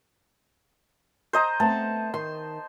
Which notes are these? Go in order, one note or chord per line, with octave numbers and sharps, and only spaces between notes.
C5 D#5 A#5
A3 B3 C4 A5
D#3 C6